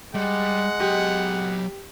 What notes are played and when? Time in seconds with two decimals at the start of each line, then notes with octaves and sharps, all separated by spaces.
0.14 G3 G#3 F#5
0.80 F#3 G4 D#5